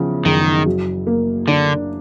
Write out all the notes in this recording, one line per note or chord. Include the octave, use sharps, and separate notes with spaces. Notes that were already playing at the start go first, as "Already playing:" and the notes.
Already playing: E2 C#3 F3
F#1 D#3
F#3
A#3
D3 D4